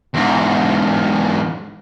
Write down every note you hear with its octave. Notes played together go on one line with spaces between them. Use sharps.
E2 G#2